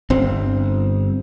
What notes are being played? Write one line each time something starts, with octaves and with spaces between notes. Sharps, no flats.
G1 C4